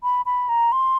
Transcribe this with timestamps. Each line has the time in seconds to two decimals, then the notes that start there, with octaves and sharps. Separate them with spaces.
0.03 B5
0.26 B5
0.49 A#5
0.72 C6